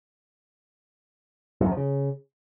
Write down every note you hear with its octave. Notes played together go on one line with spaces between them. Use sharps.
G2
F#2
F3
C#3